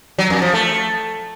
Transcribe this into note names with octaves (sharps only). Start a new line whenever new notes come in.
F#3
F2
F3
A3